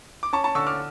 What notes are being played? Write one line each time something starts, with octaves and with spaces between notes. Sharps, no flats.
D6
C#4 A5 C#6
A5 C#6
D3 C#6 E6
D6 F6